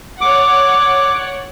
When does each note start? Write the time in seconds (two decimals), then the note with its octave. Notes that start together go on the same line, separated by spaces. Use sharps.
0.21 C#5 D5 F#5 D6